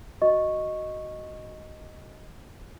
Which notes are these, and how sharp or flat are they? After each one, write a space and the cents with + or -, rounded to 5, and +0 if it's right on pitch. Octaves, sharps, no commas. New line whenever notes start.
F#4 +0 D#5 +0 C#6 -10